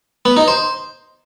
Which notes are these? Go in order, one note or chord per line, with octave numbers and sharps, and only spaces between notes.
B3
D#4
C5